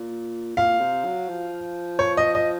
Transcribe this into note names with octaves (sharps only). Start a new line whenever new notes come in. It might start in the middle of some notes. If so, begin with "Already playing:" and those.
Already playing: A#2
A#2 F5
C3
F#3
F3
C#5
D#5
D#5